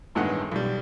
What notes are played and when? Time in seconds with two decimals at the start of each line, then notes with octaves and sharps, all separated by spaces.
0.15 A1 G2 D#3 G#3 B3 F#5
0.52 B1 G3